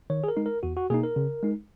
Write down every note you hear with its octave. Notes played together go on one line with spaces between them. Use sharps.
D#3 C#5
G#4
A#4
G#3 D#4
A#4
E2 F#4
F#4
B2 A#3 D#4 G#4
A#4
C#3
G#3 D#4